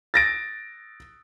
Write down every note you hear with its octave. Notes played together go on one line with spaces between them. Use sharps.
A6 A#6 D7